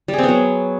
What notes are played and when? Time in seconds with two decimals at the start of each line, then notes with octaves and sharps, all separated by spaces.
0.08 G3
0.13 G#4
0.18 C4
0.24 B3
0.29 F#3